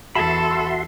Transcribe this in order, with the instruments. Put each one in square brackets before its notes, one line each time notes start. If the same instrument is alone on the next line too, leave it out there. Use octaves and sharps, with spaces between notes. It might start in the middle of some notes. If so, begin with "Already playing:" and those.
[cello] E2 A4 [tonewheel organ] F#4 E5 C6 [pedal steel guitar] A5 B5